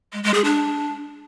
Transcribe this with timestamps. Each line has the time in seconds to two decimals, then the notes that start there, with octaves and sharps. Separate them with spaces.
0.13 G#3
0.23 G#3
0.34 G#4
0.44 D4